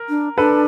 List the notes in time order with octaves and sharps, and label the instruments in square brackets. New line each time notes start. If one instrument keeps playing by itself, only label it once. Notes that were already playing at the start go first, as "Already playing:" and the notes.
Already playing: [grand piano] A#4
[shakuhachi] D4
[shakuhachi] D4 [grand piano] A4 B4